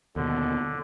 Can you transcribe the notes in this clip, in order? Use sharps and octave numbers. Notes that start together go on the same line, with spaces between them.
D#2 B2 D3